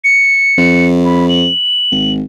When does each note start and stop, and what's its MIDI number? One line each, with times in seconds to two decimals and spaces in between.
0.04 0.86 97
0.58 1.48 41
1.05 1.29 83
1.29 2.12 102
1.92 2.22 32